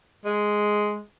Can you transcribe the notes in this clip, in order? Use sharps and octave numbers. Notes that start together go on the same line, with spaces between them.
G#3